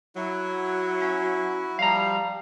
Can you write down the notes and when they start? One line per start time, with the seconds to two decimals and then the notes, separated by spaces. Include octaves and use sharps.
0.16 F#3 E4 F#4
1.02 C#4
1.79 F3 G3 F5 A#5